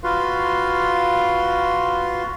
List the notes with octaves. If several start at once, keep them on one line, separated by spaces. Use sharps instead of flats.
F4 F#4 B4 F5 C6